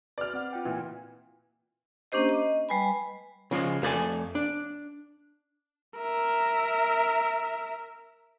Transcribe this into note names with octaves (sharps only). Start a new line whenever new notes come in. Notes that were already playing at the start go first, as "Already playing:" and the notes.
B4 D5 F6
C4 F#5
F4 G5
A#2 E3
A#3 C#4 D4 G4 C5 D#5
D#5
G3 B4 G#5 B5
C#3 F3 G#3
F2 A3 D#4 D5 G#5
D4
A#4 E5